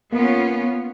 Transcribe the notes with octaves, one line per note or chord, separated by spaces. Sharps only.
A#3 B3 C#4 F4